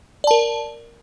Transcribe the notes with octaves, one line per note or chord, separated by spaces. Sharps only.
A#4 D5 A5